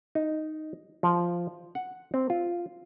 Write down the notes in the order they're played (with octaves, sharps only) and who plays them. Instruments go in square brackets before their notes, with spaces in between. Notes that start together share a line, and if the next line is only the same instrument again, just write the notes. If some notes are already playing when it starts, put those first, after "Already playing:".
[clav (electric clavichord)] D#4
F3
F#5
C4
F4